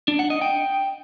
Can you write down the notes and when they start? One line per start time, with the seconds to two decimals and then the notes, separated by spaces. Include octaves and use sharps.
0.08 D4
0.19 F#5
0.30 D#5
0.42 G5